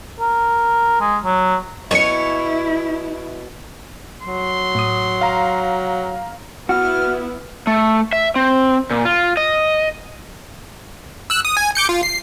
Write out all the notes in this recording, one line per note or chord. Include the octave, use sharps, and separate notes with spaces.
A#4
G#3
F#3
F#2 B2 E4 C#5 G#5 C#7
F#3 C6
A2 D#6
F5 A#5
B3 E4 F#4 F6
A3
E5
C4
A#2
F4
D#5
E6 F#6
D#6
G#5
D6 G6 C#7
F4
C7